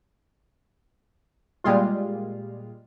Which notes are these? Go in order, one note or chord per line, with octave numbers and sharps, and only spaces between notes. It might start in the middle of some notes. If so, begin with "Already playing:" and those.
A#2 G3 G#3 F4